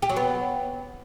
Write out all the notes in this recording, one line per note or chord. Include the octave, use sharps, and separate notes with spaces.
G4
F#3
B3